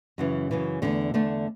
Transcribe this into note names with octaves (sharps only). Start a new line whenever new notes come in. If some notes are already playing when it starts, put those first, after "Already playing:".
F#2 C#3 E3
F#2 C#3 E3
E2 D3 A3 D4
E2 D3 A3 D4